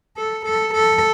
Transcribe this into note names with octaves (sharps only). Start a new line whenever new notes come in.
A4
A4
A4